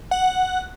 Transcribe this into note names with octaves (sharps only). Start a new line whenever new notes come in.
F#5